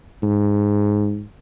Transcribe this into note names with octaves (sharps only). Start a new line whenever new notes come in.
G#2